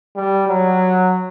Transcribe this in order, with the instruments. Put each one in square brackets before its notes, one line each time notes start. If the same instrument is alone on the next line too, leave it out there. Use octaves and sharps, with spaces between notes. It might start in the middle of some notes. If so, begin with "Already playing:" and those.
[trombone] G3
F#3